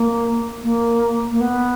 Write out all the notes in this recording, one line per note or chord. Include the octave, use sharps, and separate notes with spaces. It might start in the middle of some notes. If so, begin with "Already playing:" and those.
Already playing: A#3
A#3
A#3
B3